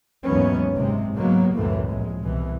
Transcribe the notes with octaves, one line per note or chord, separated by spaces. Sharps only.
D#2 G#2 E3 F#3 B3 C#4
F#1 G#2 C3 G#3
G#2 C#3 F#3 G#3 A#3 B3
C#2 F#2 A2 C3 E3 A3
A#1 G#3
C2 B2 E3